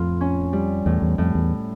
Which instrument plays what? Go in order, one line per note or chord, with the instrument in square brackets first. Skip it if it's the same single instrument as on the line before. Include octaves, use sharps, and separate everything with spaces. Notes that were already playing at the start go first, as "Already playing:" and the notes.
Already playing: [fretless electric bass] F2 [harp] A2 F4
[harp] C#4
G3
[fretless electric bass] E2 [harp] A2
[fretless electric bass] E2
[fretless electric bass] F2 [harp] A2
[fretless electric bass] E2